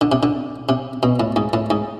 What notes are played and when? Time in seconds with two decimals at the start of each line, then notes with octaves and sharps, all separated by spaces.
0.01 D3
0.12 C3
0.23 D3
0.69 C3
1.03 B2
1.20 A2
1.36 G#2
1.53 A2
1.70 G#2